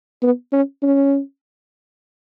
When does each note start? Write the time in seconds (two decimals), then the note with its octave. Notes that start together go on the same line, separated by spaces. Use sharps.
0.23 B3
0.52 C#4
0.83 C#4